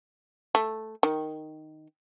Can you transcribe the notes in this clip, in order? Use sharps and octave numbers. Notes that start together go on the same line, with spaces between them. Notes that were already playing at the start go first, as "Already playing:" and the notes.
A3
D#3